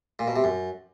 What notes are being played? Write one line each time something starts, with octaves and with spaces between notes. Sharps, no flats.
A#2
B2
C3
F#2